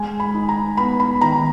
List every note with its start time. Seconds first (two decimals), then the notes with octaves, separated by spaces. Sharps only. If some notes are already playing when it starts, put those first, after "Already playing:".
Already playing: G#3 G#5
0.20 B5
0.34 D#4
0.49 A#5
0.77 B3 B5
1.00 B5
1.21 D#3 A#5